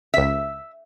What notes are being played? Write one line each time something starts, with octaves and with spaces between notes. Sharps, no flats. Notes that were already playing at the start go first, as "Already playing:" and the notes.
C#2 E5 B6